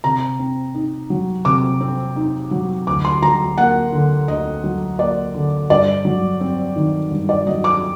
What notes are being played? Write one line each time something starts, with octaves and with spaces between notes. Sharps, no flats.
C3 A#5
C4
D#4
F#3
C3 D6
C4
D#4
F#3
D2 D6
C6
F#3 A#5
A#3 F#5
D3
D2 D#5
F#3
A#3 D5
D3
G2 D5
F#3
C4
D#3
G2
D5
F#3 D#5
D6